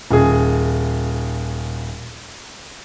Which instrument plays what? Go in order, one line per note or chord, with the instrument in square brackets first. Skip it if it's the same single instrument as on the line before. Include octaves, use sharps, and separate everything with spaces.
[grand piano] D#1 G#4